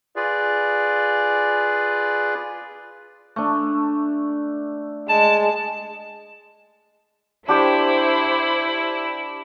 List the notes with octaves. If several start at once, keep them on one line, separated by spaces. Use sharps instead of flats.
F4 G#4 B4 D5
A3 D4
G#3 A5
D4 E4 G4 C5 C#6